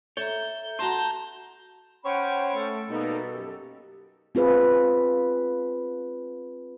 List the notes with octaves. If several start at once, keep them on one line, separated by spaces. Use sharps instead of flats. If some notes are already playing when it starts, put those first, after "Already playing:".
A4 C#5 E5 A#5 G6
F#4 A5 A#5 C6
C#4 C5 C#5 F#5 G5 B5
A3 A4
B2 G3 A#3 D#4
F#2 G4
C4 F4 G#4 B4